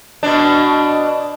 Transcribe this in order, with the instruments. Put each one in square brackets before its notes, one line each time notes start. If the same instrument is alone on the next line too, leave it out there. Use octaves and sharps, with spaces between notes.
[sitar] B2 D4